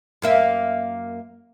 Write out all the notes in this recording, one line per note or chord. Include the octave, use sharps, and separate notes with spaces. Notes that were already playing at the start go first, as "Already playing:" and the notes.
F#2 A#3 E5